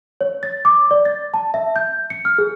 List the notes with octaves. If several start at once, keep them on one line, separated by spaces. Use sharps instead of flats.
C#5
A6
D6
D5
A6
A5
E5
G6
C#7
F6
G#4